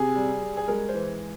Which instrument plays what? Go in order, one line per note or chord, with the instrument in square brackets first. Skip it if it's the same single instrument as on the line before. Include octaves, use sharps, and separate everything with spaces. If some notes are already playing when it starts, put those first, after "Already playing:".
Already playing: [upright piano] C3 G#4
G3
G3
G#4
G#3 A#4
C5
E3